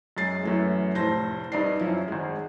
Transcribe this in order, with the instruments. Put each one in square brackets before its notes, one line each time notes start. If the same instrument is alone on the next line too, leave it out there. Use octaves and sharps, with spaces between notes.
[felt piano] F#2 G#3 A6 C7
F#2 E3 A3
F1 A2 C5 A5 A#6
G2 D#4 D5 C7
F#2 F3 E4
G#1 G#3